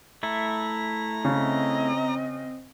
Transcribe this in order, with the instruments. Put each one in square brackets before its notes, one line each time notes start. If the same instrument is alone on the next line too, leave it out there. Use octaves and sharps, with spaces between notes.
[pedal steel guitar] A3 E4 [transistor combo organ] A#5
[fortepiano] C#3 [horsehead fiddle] C4 D#5